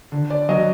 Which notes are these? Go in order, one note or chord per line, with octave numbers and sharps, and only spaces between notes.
D3
D5
F#3 D#5